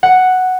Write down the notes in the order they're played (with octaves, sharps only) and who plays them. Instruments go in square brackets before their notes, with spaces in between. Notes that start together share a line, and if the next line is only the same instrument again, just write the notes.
[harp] F#5